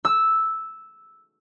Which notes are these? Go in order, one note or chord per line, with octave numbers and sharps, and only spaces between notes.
E6